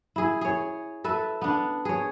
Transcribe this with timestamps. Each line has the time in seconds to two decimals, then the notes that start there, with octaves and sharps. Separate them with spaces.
0.16 E4 G#4
0.41 G#4 C#5
1.04 A4 B4 E5
1.42 B3 D4
1.85 G#4 C#5